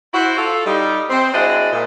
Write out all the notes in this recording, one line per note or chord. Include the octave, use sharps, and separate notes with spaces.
E4 F#4 C5
F4 A4
G3 D#4
C4
G#3 D4 E4 F#4 C5 D#5
A#2